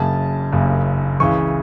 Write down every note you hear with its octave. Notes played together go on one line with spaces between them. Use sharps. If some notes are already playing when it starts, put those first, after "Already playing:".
Already playing: F#1 F#2 C#3 A5
F#1 F#2 C#3
C#2 C#3 E3 C#6